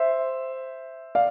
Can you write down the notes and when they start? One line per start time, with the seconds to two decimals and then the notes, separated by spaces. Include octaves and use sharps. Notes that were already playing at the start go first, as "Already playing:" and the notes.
Already playing: C5 E5
1.15 D5 F5